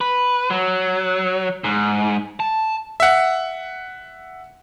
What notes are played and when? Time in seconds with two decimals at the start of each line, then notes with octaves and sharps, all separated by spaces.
0.01 B4
0.50 F#3
1.64 G#2
2.40 A5
3.00 E5 F#5